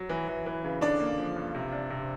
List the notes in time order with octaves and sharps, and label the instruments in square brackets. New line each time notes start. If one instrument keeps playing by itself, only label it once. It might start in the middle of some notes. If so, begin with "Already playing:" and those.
Already playing: [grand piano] F#3
E3
E3
E3
C#3
[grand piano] D3 [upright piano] D4 D5
[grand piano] A#3
F3
G2
C3
D4
C3